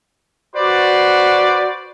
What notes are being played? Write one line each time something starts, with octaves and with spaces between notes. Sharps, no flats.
F#4 B4 C5 D5